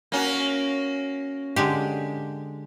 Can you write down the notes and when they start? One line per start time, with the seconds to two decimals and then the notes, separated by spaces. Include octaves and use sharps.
0.12 A#3 C#4 F#4
1.56 D3 G#3 G4